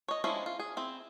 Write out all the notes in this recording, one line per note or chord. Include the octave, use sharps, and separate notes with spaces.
C#5 D#5
F3 G#3 C#4 D4 E4
F4
G#4
C4 E4